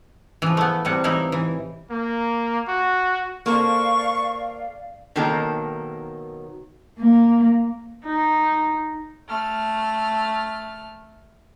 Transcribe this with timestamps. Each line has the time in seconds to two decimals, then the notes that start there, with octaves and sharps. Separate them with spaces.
0.42 E3 F3
0.57 A3 B3
0.85 A2 C3 G3 F#5
1.04 E3 D#4 E4 F5
1.32 E3
1.90 A#3
2.68 F#4
3.46 A#3 A4 C5 D5 F5 C#6
5.16 B2 D#3 F#3 A#3 A4 G5
6.99 A#3
8.05 D#4
9.28 A3 F6